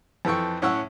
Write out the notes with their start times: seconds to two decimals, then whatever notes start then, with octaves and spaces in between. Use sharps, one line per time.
0.25 F2 E3 A4 G5 C#6
0.62 A2 C#4 F#5 C#6 E6